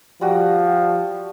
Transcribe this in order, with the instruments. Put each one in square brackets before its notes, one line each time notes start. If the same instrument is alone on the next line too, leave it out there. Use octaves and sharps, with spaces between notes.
[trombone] F3 [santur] G3 F#4